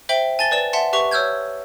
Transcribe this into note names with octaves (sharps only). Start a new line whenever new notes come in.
C5 E5 G5 F#7 G7
G#5 A5 A6 G7
B4 D5 E7
E5 F#5 A5 C6
G4 B4 E5 C#6 F7
C#5 E6 F6 G6 G#6